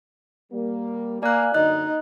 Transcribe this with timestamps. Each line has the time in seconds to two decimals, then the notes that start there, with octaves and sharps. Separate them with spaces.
0.52 G3 A#3
1.23 A#3 D5 F5 G#5 F#6
1.54 F#2 D3 D#4 D#5 F#6